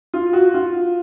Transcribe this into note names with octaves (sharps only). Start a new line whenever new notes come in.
F4
F#4
F4